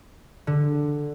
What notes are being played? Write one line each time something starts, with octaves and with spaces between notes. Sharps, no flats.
D3